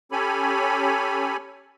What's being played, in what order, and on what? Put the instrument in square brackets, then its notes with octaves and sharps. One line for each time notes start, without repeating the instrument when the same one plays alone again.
[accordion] C#4 G4 A4 C#5 G#5 B5